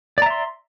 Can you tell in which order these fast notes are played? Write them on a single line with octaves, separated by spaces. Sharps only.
D5 A#5 E5 C6